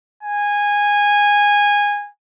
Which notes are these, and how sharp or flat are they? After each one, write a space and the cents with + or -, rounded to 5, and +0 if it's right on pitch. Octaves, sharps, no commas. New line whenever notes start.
G#5 -15